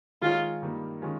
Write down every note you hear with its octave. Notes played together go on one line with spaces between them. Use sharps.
D#3 G#3 D#4 F4 G#4 C#5
G2 D#3 G3 A#3
D#3 G#3 C#4 F4